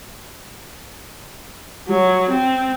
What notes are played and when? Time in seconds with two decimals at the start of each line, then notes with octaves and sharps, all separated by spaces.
1.88 F#3
2.30 C4